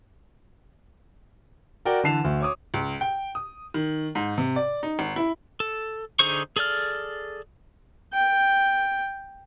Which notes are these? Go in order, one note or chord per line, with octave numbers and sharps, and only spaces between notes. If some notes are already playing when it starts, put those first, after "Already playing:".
F#4 A#4 D5 G5
D3 E3 A5 C7 E7 F7
D2
C#5 D6 D#6
C#2
G5
D#6
D#3
G#2
C3
D5
D#4
G#1
E4
A4
D3 D#4 G#4 C5 C#6
G#4 A4 D5 F6
G5